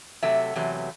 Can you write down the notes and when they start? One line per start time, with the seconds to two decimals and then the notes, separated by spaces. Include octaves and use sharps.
0.23 C3 F#3 A3 E5
0.56 E2 C3 F#3 A3